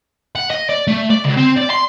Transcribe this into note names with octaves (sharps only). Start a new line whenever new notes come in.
F#5
D#5
D5
A3
D5
C#2
C4
D5
C6